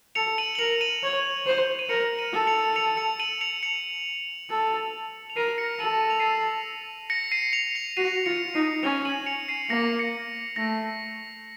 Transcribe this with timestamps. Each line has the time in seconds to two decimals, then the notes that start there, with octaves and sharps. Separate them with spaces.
0.15 A4 C#7 F7
0.38 D#7 F#7
0.55 F#7
0.59 A#4 C#7 F7
0.81 D#7 F#7
1.03 C#5
1.46 C5
1.79 D#7
1.89 A#4 C#7 F7
2.18 D#7 F#7
2.33 A4
2.47 C#7 F7
2.76 C#7 F7
2.97 C#7 F7
3.20 D#7 F#7
3.41 C#7 F7
3.63 C#7 F7
4.50 A4
5.30 F7
5.36 A#4 C7 D#7
5.58 A#6 C#7
5.80 A4 D#7 F#7
6.01 D#7
6.10 F7
6.20 C7 D#7
7.10 A#6 C#7
7.32 C7 D#7
7.53 C#7 F7
7.75 C#7 F7
7.97 F#4 C7 D#7
8.26 F4 A#6 C#7
8.54 D#4 C7 D#7
8.83 C#4 C#7 F7
9.05 D#7 F#7
9.26 C#7 F7
9.48 C7 D#7
9.70 A#3 A#6 C#7
9.99 A#6 C#7
10.56 A3 A#6